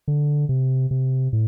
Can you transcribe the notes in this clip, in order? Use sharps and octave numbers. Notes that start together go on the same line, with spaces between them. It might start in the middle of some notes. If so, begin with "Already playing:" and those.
D3
C3
C3
A2